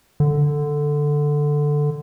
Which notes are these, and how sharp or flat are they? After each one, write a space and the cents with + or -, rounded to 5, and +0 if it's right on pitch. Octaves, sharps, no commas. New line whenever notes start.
D3 +5